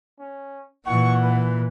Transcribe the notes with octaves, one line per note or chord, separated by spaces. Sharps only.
C#4
A#2 E3 F#5 C#6
B4